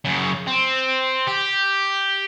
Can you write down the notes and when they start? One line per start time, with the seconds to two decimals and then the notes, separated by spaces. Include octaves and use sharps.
0.05 F#2 C#3
0.47 C4
1.27 G4